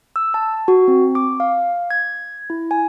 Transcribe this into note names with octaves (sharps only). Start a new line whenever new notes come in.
E6
A5
F#4
C4
D6
F5
G#6
E4
G#5